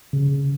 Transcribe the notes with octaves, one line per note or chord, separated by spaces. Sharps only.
C#3